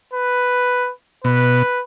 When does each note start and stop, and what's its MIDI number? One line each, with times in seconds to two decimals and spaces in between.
0.14 0.91 71
1.24 1.63 47
1.24 1.81 71